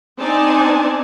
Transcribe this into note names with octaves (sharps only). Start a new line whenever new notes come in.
C4 D4 D#4 D5 G#5 A5